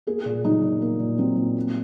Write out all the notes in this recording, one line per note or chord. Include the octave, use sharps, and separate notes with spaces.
A#3 G#4
A#2
F#3 D#4
A#2
A#3
A#2
F#3 C4
A#2
A#3